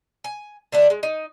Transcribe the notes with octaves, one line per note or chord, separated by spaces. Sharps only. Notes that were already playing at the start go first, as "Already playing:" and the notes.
G#5
D3 A3 D4
G#3
D#4